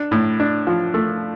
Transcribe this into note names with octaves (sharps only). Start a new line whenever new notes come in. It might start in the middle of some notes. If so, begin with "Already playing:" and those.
Already playing: D4
A2
D4
F3
A3